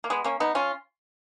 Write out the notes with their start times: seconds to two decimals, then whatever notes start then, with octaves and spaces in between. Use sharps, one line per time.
0.04 A#3
0.10 G#3 B3
0.24 A#3 C#4
0.40 B3 D#4
0.55 C#4 F4